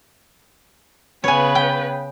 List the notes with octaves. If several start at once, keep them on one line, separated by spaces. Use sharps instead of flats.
C#3 B3 B4 C#5 G#5
G5